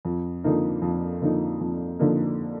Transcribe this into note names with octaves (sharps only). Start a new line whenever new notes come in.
F2
D3 F3 A#3 D#4
F2
D3 F3 A#3 D#4
F2
D3 F3 A#3 D#4